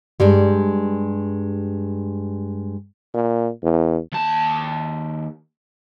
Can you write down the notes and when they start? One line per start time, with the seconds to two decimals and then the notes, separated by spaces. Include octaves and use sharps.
0.20 G2 G3 G#3
3.14 A#2
3.63 E2
4.12 D#2 A5